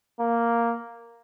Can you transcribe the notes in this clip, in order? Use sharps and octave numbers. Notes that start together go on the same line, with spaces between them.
A#3